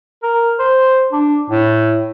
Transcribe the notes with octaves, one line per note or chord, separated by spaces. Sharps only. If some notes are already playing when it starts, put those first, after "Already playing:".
A#4
C5
D4
A2